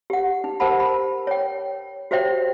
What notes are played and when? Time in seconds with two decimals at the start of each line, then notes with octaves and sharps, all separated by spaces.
0.10 G4 F#5
0.44 D#4
0.60 G4 A#4 C5 F#5 A5 B5
0.80 B5
1.27 C#5 G5
2.11 F#4 G4 C5 C#5 E5 G5